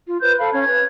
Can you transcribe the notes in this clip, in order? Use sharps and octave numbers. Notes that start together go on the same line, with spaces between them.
F4
B4 C5 G6
A4 F5 B5
C#4 G#6
B4